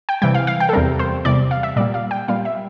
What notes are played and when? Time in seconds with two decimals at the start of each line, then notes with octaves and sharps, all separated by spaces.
0.09 G5
0.22 C3 E3 G3 G5
0.34 F5
0.47 F5
0.60 G5
0.69 A4
0.73 E2 C3 G3 A#4
0.99 C5
1.25 E2 C3 G3 D5
1.51 F5
1.63 E5
1.76 A#2 G3 A#3 D5
1.94 F5
2.11 G5
2.28 A#2 G3 A#3 F5
2.45 E5